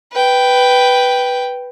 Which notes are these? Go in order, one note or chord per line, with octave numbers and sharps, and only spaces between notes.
B4 G5